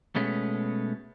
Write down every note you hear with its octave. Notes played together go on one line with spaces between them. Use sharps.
B2 G#3 A3 B3 C#4